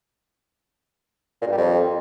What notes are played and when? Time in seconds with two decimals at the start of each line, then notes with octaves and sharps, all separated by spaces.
1.42 A#2
1.47 G2
1.52 G3
1.57 F2